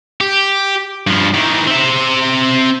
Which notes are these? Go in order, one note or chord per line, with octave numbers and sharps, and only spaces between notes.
G4
G2 F3
D#3 E3
C4 E5